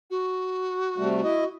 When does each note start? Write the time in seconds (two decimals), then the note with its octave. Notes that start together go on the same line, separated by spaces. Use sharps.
0.10 F#4
0.98 C3 G3 A3
1.24 E4 D#5